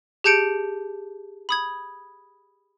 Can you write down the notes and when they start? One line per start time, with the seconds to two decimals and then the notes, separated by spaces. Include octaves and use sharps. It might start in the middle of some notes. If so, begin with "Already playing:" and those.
0.24 G4 G#4 A5 G6 C#7 D7
1.49 B5 D#6 G#6